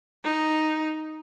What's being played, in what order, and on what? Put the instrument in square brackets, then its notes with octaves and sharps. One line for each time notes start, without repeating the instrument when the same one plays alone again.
[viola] D#4